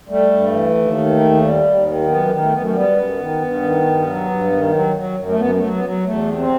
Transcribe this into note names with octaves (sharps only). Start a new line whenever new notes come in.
G3 A3
G2
E3
D#2
D#3
D#2
G3
D#2
D#3
F#2 B3
D#3
A3
F#2 B3
A3
G3 B3
F#2
D#3
G2
D#3
G2
F#3
G2
D#3
F#3
F#3
F#2
A3
F#2 B3
F#3 A3
B3
F#3
E2 A3
C3
C4